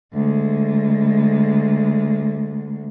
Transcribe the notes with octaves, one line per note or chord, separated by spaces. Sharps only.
D2 G#3